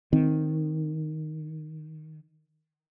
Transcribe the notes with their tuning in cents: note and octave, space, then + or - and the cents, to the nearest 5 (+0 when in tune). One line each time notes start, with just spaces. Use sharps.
D#3 +0 C4 +0